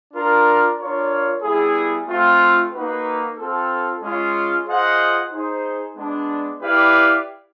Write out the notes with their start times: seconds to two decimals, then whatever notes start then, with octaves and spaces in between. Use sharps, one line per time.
0.13 D4 F4 A#4
0.79 D4 F4 A#4 C#5
1.42 G3 B3 E4 G#4
2.08 A3 C4 F4
2.72 A#3 D#4 F#4 B4
3.37 C4 F4 A4
4.01 G#3 C#4 F4
4.67 F4 G#4 C5 D#5 F#5
5.31 D#4 G#4 C5
5.96 G#3 B3 D4
6.60 E4 G4 B4 D5 F5